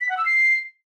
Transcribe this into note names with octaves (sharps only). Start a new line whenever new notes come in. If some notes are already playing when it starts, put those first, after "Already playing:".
B6
F#5
E6
C7